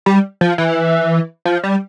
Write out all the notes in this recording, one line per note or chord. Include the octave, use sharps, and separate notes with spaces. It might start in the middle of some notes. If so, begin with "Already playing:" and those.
G3
F3
E3
F3
G3